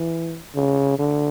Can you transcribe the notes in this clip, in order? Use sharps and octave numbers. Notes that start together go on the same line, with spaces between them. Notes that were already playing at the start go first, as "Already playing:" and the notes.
Already playing: E3
C#3
D3